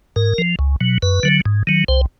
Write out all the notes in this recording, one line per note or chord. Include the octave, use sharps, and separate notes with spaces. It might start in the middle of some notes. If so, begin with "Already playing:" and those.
G#2 A#4
F3
C#2
B2 F#3
F#2 B4
D3 F#3
G#2
D#3 F#3
C2 C5